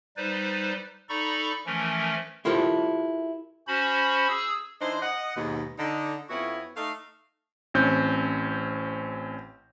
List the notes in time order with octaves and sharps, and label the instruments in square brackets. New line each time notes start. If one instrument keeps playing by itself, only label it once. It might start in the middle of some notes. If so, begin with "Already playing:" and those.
[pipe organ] G3 D#4 B4 C5 D5
D#4 A4 D5 A#5 B5 C#6
E3 F3 A3 C#4 A#4
[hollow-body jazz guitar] E4 F4 G4 A4 A#4 C5
[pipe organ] C#4 F#4 C5 B5
G#4 E6
[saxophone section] E3 D4 D#4 C5
D#5 F#5
D#2 G#2 B2
D3 D#4
F2 B3 C#4 E4 F#4 C#5
A3 D#4 F5
[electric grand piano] A1 C4 C#4 G6